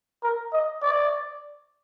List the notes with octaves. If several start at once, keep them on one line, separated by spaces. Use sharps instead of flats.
A#4
D#5
D5